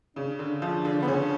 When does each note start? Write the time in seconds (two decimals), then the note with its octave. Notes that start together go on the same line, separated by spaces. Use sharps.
0.16 C#3 D4
0.39 D3
0.62 F3
0.85 D3
1.02 B3
1.07 C#3 C#4